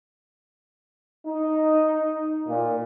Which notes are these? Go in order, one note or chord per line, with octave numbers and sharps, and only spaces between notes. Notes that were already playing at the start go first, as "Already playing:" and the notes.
D#4
A#2